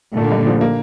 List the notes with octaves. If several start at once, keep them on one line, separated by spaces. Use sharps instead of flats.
A#2 D3 A3
G2
F3
A#3